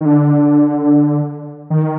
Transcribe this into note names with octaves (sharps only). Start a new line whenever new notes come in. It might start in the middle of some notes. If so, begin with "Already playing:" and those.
D#3
D3
D#3